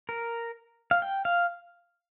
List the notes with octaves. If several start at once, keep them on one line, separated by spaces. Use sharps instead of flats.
A#4
F5
G5
F5